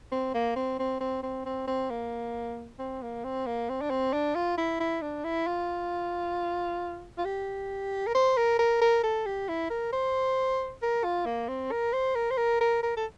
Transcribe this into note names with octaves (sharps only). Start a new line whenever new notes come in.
C4
A#3
C4
C4
C4
C4
C4
C4
A#3
C4
A#3
C4
A#3
C4
D4
C4
D4
F4
E4
E4
D4
E4
F4
F4
G4
A#4
C5
A#4
A#4
A#4
A4
G4
E4
A#4
C5
A#4
F4
A#3
C4
A#4
C5
A#4
C5
A#4
A#4
A#4
A4